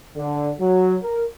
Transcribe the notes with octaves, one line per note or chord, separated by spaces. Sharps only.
D3
F#3
A#4